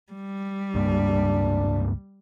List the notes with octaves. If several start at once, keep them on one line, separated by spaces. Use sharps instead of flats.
G3
C#2 G2 A#3 D4